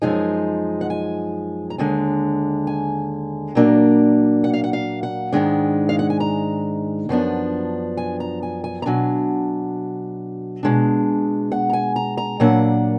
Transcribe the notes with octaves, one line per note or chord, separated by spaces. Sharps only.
F#2 F3 G#3 D#4 G#5
F#5
G#5
A#5
D#2 D3 G#3 G#5
G#5
A#2 F#3 A#3 D4
F#5
F5
F#5
F5
F#5
G#2 D#3 G#3 D4
F5
F#5
G#5
A#5
F#2 F3 B3 D4
G#5
A#5
G#5
G#5
A#5
B2 F#3 D4 G#5
B2 G#3 D4
F#5
A#5
G#5
A#5
A#5
A#2 F#3 A#3 D4 F#5